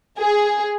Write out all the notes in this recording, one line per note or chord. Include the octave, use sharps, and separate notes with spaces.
G#4